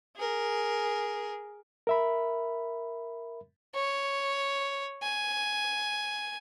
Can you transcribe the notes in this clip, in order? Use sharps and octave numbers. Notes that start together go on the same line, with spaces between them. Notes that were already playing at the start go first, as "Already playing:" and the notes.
G#4 A#4
A#4 E5 B5
C#5
G#5